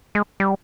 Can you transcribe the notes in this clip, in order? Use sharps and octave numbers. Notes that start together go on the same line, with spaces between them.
G#3
G3